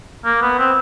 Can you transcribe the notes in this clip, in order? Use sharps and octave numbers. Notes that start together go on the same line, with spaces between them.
A#3
B3
C4